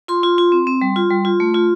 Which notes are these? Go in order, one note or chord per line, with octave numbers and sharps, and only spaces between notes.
F4 C6
F4
F4
C4
C4
G3
F4
G3
F4
A3
F4